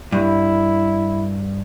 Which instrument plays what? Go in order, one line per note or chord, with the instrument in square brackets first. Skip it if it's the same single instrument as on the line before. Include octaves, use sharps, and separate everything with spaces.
[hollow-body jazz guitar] G2 [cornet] E4